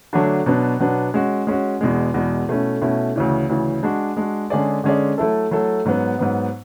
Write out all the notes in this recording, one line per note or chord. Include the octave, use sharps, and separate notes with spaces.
D3 F#3 A3 D4 F#4
B2 F#3 B3 D4
B2 F#3 B3 D4
G#3 C#4 F#4
G#3 C#4 F#4
E2 B2 G#3
E2 B2 G#3
B2 A3 C#4 E4
B2 A3 C#4 E4
D2 C#3 E3
D2 C#3 E3
G#3 D4 F#4
G#3 D4 F#4
D3 G#3 C#4 G#4 D5
D3 G#3 C#4 G#4 D5
F#3 A3 E4 A4
F#3 A3 E4 A4
G#2 F#3 B3
G#2 F#3 B3